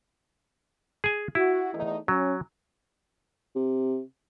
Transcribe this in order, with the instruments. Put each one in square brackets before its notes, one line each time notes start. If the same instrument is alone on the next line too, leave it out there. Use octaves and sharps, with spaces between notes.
[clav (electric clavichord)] G#4 G#5
[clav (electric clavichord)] E4 [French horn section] F#4
[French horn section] E2 A3 D#4
[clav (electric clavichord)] F#3 [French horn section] C#4
[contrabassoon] C3